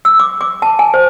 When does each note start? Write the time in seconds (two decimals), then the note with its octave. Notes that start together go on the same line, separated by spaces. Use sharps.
0.05 E6
0.20 D6
0.41 D6
0.62 A5
0.79 G#5
0.94 C5